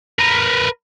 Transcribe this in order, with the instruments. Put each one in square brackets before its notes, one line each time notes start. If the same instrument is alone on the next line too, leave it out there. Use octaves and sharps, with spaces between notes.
[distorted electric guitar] A#4 B4